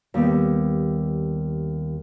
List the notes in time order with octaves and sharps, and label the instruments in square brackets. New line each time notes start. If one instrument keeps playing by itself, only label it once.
[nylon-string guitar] D#2 G3 B3